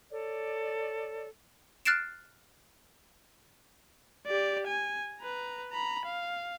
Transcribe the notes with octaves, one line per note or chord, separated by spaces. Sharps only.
A4 C#5 D5
F6 F#6 A6 C7 D7 E7
G4 D5
G#5
B4 A#5
A#5 B5
F5